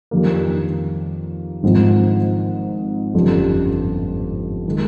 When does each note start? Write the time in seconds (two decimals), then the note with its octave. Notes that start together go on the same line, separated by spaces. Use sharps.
0.11 F2 D#3 G3 A#3
1.63 G#1 G#2 F3 C4 D#4
3.14 G1 F2 C#3 G3
4.68 D#3 G#3